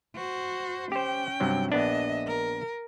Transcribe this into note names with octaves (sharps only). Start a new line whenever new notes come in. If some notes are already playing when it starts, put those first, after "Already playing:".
F#4 C5
C#4 G4 C5 G5
G2 C3 F#3
A#1 B3 D4 D#5 E5
A#4